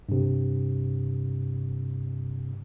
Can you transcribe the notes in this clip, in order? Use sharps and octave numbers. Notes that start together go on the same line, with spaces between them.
G2 C3